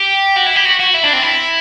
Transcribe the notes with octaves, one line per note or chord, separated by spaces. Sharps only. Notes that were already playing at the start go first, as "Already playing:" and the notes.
Already playing: G4
F#4
E4
G4
F#4
F#4
E4
D4
C4
E4